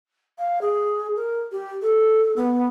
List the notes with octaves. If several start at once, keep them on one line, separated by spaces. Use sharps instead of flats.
F5
G#4
A#4
G4
A4
B3